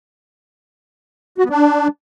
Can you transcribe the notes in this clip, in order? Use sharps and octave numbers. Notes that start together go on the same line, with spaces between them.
F#4
B3
D4